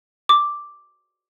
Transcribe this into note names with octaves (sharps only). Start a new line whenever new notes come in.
D6